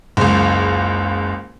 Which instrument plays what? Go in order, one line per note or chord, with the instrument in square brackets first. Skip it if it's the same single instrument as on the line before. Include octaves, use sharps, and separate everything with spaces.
[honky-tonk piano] F#1 C#2